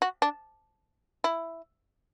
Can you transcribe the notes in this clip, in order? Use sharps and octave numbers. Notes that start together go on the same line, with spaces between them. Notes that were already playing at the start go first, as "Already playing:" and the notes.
F#4
D4
E4